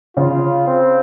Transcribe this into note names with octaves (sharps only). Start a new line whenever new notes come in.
C#3 F4
C4